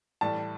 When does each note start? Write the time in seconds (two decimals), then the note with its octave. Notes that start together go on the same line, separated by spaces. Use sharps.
0.21 A2 E3 G3 A5